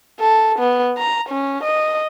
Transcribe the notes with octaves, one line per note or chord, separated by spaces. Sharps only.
A4
B3
A#5
C#4
D#5